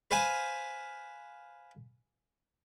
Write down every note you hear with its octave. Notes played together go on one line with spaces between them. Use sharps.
B4 C5 F5 G#5